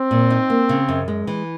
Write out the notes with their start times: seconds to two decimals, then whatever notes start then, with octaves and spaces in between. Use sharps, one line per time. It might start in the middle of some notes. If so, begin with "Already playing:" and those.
Already playing: C4
0.11 A#2
0.30 D#4
0.50 A#3
0.69 C#3
0.89 F#2
1.08 G#3
1.27 E3